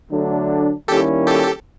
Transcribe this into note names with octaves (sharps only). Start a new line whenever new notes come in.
D3 F#3 A3 D4
D#3 G3 A#3 C#4 E4 G4 A4
G4 A4